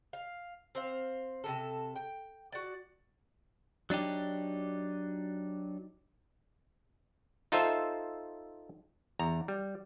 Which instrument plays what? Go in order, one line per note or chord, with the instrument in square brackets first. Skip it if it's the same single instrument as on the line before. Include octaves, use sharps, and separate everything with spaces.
[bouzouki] F5
C4 C5 F5
C3 D#3 A4
G5
F#4 D5
[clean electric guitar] F#3 D4 D#4 G4
[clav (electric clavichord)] D#4 F4 A4 C5 E5
E2 A#5
G3